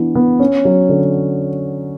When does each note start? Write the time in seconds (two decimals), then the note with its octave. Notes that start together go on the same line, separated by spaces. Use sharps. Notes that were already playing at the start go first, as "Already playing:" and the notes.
Already playing: E3 B3 D4
0.15 B3
0.40 C#4
0.65 F#3
0.89 D3